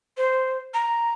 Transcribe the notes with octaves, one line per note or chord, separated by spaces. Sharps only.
C5
A#5